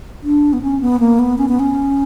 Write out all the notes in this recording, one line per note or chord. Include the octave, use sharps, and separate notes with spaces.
D4
B3
C#4
B3
A#3
B3
C#4
B3
C#4